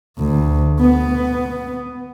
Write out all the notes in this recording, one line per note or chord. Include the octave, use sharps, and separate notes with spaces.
D2
B3